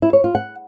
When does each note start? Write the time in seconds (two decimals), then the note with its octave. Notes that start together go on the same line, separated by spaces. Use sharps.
0.02 E4
0.13 C#5
0.24 F4
0.35 F#5